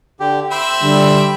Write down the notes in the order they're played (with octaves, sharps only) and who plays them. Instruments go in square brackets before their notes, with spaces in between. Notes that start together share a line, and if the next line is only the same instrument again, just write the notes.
[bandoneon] D3 G4
[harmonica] C4 C5 E5 [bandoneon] B5
[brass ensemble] D3 G3